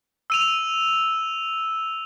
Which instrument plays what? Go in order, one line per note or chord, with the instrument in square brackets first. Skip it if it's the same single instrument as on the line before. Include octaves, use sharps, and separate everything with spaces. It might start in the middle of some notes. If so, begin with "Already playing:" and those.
[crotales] E6 D#7 F7